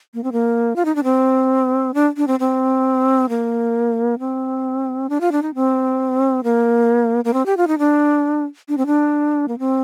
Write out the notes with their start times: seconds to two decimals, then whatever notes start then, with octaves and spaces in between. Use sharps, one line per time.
0.14 A#3
0.24 C4
0.32 A#3
0.76 F4
0.85 D#4
0.95 D4
1.04 C4
1.94 D4
2.17 D4
2.27 C4
2.40 C4
3.29 A#3
4.19 C4
5.09 D4
5.21 F4
5.32 D4
5.42 D#4
5.55 C4
6.44 A#3
7.24 A#3
7.33 C4
7.46 G4
7.57 F4
7.68 D#4
7.78 D4
8.68 D4
8.77 C4
8.86 D4
9.48 A#3
9.59 C4